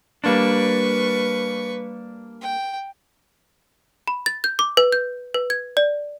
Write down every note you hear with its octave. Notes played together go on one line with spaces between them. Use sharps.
G3 A#3 D4 B4 C#6
G5
B5
A6
G6
D6
B4
G6
B4
G#6
D5